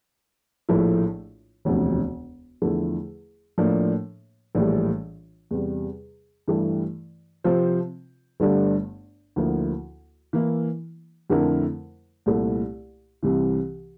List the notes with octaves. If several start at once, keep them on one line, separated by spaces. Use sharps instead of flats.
A#1 A2 F3 A3 E4
E1 D2 C3 F3
E2 D3 F3 A3 E4
A2 F3 A#3 D4
A#1 A2 E3 G3
E2 C3 G3
G2 E3 A3 E4 G4
C3 F3 C4 F4 C5
G1 G2 D3 A3 D4
D2 D3 F3 A#3 E4
E3 A#3 E4
F2 D3 A3 E4 A#4
C2 A#2 A3 E4
C2 C3 E3